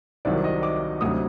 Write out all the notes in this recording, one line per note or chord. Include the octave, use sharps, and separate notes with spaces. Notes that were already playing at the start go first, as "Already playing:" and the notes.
C2 C3 D#3 F#3 D5
D#5
D6
D2 C3 F#3 D#6